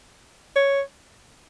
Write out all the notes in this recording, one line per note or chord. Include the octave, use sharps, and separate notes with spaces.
C#5